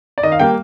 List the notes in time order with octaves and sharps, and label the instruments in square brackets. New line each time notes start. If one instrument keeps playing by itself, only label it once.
[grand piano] D5
D#3 D#5
F5
G3 A#3 G5